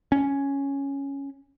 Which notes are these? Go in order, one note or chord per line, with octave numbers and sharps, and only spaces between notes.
C#4